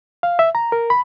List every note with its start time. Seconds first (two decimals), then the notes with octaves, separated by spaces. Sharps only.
0.23 F5
0.39 E5
0.55 A#5
0.72 A#4
0.90 B5